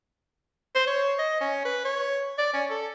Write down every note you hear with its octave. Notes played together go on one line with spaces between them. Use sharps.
C5
C#5
D#5
C#4
B4
C#5
D5
C#4
A4